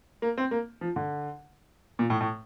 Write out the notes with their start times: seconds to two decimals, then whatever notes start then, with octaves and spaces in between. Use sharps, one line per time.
0.22 A#3
0.38 C4
0.51 A#3
0.81 F3
0.96 D3
1.99 A#2
2.10 A2
2.21 A2